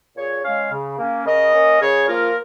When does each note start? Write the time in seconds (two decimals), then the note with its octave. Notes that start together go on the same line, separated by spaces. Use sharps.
0.16 A#2 G#4 C#5
0.44 G#3 C#4 C#5 F5
0.72 C#3
0.99 A#3 C#4
1.26 C#3 A#4 D#5
1.54 A#3 C#4
1.81 C#3 G#4 C#5
2.08 F3 A#3 F4 A#4